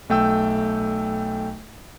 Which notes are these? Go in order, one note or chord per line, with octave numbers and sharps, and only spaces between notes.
B1 A3 G5 E6